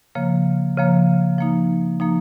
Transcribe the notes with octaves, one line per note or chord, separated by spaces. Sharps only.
C#3 F3 A#3
C#3 F3 A#3
F3 A#3 D#4
F3 A#3 D#4